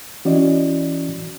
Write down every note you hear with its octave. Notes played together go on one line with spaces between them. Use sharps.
E3 C#4 E4 F#4 D5 D#5